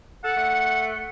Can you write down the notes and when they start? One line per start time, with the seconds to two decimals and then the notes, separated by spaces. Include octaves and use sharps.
0.24 A4 F#5
0.36 A3